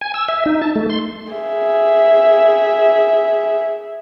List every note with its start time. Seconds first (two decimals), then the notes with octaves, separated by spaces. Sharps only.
0.01 G#5
0.14 E6
0.28 E5
0.46 D#4
0.61 A5
0.75 A3
0.90 C6
1.33 G#4 E5